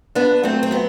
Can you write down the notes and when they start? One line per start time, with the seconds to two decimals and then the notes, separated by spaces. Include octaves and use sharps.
0.15 F#2 B3 D4
0.43 F#3 A3 C4
0.63 C4
0.71 F#3 B3